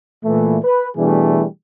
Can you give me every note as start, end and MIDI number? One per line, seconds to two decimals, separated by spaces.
0.24 0.57 46
0.24 0.57 52
0.24 0.57 57
0.64 0.88 71
0.97 1.45 47
0.97 1.45 52
0.97 1.45 55
0.97 1.45 57
0.97 1.45 62
0.97 1.45 68